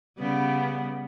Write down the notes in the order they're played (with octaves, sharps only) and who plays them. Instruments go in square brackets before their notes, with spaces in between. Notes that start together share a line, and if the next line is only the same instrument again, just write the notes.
[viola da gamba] C#3 G3 B3